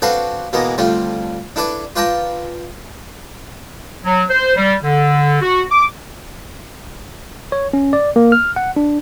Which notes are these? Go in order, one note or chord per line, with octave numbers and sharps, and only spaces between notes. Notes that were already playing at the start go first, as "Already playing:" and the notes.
C4 D4 F#4 A4 B4 F5
B2 E3 G#3 A#3 B3
F2 D3 G3 A3 F4
D4 E4 A4 B4 D5
F4 B4 D5 G5 A5 A#5
F#3
C5
G3
D3
F#4
D6
C#5
C#4
D5
A#3
F6
F#5
D4